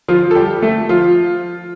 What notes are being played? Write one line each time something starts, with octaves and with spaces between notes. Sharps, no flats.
F3 F4
A4
G3 G4
A3 A4
F3 F4